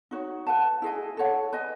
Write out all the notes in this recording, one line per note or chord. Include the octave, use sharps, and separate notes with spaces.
D#4 F#4 C#5
B4 F#5 A5
E4 G#4 D#5 G#5
A4 C#5 F#5
B4 D#5 G#5